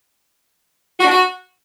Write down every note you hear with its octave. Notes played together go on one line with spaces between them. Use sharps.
F#4
D4
F#4